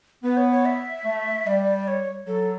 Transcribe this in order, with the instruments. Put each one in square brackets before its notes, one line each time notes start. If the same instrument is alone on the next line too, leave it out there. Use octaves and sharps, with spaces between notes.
[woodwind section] B3 [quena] B4
[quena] C#5
C#5
E5
[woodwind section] A3
[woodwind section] G3 [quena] D5
[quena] C#5
[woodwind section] F#3 [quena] A4